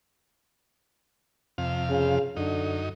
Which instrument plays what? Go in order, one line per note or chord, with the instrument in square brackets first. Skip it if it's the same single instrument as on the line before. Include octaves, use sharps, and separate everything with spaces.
[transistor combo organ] F2 C3 F5
[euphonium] C#3
[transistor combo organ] F#2 D#4 [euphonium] D3